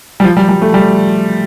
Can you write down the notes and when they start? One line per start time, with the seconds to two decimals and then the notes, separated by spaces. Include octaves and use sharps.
0.20 G3
0.24 F3
0.37 G3
0.49 G3
0.62 A3
0.74 G3